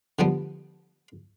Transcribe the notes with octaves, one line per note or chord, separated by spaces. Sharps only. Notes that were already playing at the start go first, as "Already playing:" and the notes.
D3 F3 G3 B3